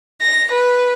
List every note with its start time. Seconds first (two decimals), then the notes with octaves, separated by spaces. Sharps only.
0.22 A#6
0.52 B4